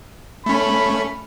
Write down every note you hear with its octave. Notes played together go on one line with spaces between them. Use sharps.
A3 C#4 B5